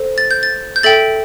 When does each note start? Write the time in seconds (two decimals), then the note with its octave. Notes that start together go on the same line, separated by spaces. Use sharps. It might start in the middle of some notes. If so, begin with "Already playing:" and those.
Already playing: A4 C5
0.18 A6
0.31 G6
0.43 A6
0.76 G6
0.83 A4 E5 G5 A6